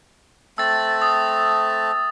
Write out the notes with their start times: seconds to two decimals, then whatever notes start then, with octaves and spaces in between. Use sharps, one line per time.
0.58 A3 C4 A5 E6 A6
1.02 D#6